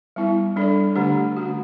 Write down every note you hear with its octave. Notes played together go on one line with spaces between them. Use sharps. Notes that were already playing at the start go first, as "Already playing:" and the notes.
G3 B3 E4
G3 D4 A4 D5
D3 A3 D4 G4
D3 A3 C#4 F#4